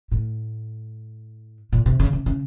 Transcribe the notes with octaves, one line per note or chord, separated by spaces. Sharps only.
A2
A#2
C3
C#3
C#3
C#3